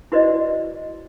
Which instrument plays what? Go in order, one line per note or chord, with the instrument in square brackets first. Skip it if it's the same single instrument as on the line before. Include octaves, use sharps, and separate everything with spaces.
[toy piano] E4 F#4 B4 C5 D5 D#5